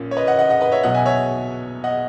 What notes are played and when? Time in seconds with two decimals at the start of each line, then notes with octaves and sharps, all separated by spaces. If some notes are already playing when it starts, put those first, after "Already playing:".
Already playing: A#1 A#2 A#3 C#4
0.11 C#5
0.17 B4 D#5
0.27 D#5 F#5
0.39 D#5 F#5
0.49 D#5 F#5
0.61 B4 D#5
0.72 C#5 E5
0.83 B1 B2 F#3 D#5 F#5
0.95 E5 G#5
1.06 C#5 E5
1.84 D#5 F#5